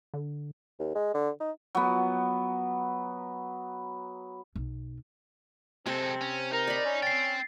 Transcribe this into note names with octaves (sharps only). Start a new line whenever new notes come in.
D3
D#2
G#3
D3
D#4
F#3 B3
B1
C3 G#3 C4 A4
C#4
D#4 A#4
D5 B5
C#4
C4 G5 A6 C7